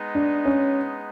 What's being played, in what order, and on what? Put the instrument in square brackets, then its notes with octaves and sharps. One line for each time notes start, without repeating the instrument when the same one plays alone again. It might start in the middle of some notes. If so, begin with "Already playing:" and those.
Already playing: [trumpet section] G#3 B3 D#4
[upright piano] D4
C#4